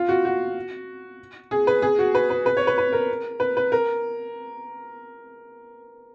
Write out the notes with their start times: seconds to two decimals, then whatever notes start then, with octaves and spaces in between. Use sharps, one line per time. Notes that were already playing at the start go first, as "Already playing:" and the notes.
Already playing: F4
0.09 F#4
0.25 F#4
1.51 G#4
1.67 B4
1.82 G#4
1.99 F#4
2.15 B4
2.30 B4
2.46 B4
2.57 C#5
2.67 B4
2.78 B4
2.93 A#4
3.40 B4
3.57 B4
3.72 A#4